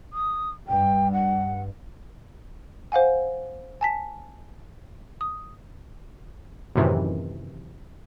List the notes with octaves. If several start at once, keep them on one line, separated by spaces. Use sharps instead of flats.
D#6
G2 G5
F#5
C5 F5 F#5 G#5
G#5 A5 B6
D#6
F#2 A2 C3 D#3 E3